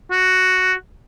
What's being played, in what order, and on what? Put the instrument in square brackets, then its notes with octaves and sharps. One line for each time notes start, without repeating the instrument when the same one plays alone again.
[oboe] F#4